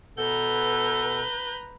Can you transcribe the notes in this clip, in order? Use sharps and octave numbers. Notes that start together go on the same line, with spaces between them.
B2 A4 B4 A#5 G6